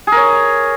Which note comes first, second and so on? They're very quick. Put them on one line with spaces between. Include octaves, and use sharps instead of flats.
G#4 A#4 C#5